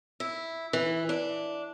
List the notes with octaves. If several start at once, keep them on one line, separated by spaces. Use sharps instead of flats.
E4
E3
D4